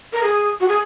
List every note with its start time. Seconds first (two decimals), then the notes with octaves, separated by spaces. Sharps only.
0.13 A#4
0.23 G#4
0.60 F#4
0.68 G#4